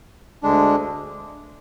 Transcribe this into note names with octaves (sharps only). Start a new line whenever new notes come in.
D2 D3 G#3 D4